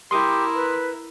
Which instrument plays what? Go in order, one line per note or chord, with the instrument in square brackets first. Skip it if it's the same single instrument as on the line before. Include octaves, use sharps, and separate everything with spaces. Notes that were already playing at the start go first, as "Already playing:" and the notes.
[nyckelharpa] E4 A#4 [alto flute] G4 [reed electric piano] C6 D#6
[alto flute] B4